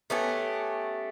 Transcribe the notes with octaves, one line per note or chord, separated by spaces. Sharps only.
A3 B3 C#4 G4